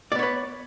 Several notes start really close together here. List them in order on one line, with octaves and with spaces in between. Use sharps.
D5 B3 C#5 B4